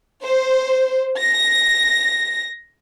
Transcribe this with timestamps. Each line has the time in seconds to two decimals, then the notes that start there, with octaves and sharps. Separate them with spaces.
0.21 C5
1.18 A#6